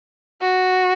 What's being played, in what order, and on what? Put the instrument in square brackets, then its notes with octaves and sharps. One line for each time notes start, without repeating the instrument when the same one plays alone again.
[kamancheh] F#4